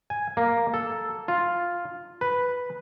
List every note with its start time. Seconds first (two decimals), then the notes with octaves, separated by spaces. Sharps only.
0.10 G#5
0.37 A#3
0.74 A4
1.28 F4
2.21 B4